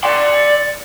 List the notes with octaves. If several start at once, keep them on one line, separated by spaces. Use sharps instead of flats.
D5 C6